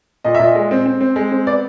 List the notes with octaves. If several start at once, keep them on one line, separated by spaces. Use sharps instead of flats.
A#2 D#5
A#2 E5
D#5
G#3
C4
C4
C4
G#3
C4
B3 D5